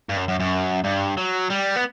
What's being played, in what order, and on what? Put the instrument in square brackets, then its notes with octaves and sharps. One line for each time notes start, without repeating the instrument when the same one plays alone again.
[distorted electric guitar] G2
F#2
F#2
F#2
G2
F#3
G3
B3